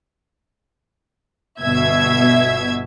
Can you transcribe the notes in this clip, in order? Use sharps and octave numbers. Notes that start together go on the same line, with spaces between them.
G1 B2 E5 G#6